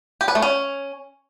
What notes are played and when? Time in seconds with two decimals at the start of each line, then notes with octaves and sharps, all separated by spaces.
0.21 G4
0.28 B4
0.35 A3
0.42 C#4